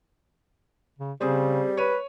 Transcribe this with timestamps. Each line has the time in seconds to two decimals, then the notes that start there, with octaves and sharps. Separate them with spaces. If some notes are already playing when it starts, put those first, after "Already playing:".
0.99 C#3
1.21 C#3 G3 C4 G#4 C5
1.77 B4 C#5 D#7